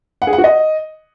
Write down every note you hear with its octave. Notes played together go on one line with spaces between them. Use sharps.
F#5
G#4
F#5
F#4
D#5